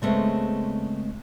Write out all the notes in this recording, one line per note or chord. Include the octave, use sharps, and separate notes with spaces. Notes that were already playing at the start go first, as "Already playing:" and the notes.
C#3 G#3 A3 B3 C4